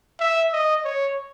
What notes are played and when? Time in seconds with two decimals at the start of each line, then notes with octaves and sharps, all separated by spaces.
0.20 E5
0.52 D#5
0.84 C#5